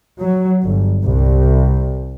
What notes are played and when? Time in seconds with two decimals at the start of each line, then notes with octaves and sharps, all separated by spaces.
0.19 F#3
0.63 G1
1.02 C2